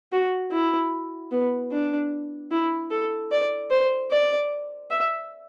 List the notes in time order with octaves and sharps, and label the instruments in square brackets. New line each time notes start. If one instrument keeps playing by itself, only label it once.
[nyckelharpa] F#4
E4
B3
D4
E4
A4
D5
C5
D5
E5